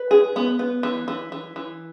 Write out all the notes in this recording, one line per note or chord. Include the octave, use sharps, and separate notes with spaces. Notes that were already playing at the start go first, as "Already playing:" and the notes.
Already playing: B4
G#4
B3
B3
E3
E3
E3
E3